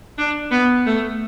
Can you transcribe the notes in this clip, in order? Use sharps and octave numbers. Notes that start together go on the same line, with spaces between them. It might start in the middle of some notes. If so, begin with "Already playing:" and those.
D4
B3
A3